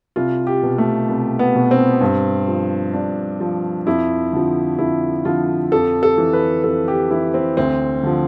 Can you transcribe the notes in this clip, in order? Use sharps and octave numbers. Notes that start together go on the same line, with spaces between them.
C2 F4
G4
B2
A3
C2
B3
B2
C4
G2
F3
G2 D4
F3
F2 E4
D3 F3
F2 E4
D3 F3 F4
F2 A4
A4
E3
B4
F2 A4
G4
E3 E4
C4
D2 C4
D3 F3